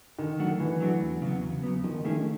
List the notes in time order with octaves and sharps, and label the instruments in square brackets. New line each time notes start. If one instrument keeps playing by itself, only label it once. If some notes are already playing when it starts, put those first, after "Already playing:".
[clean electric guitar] D3 [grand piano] D#3
[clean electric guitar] F#3 A3 D4 F#4
[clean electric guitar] D3 [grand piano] E3
[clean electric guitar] F#3 A3 D4 F#4
E2
C#3 F#3 B3
E2
C#3 F#3 B3
[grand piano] D#3 [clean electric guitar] F3
[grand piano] D#3
[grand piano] D#3 [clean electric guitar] A3 C#4 E4 G#4
[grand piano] D3